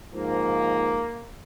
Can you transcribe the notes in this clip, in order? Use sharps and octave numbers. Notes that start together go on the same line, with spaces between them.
G#2 F3 A#3